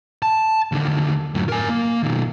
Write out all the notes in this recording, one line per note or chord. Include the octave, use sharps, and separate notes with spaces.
A5
D#2 D3
F#2 A2
A#4 G#5
A#3
B2 D#3